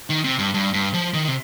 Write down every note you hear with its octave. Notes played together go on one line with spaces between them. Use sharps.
D#3
C3
G2
G2
G2
F3
D#3
C3